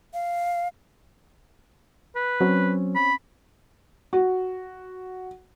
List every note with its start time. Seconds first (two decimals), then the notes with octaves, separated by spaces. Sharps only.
0.14 F5
2.16 B4
2.41 F#3 C4 C#4
2.95 B5
4.13 F#4